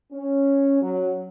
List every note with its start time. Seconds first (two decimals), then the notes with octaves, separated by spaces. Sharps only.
0.12 C#4
0.82 F#3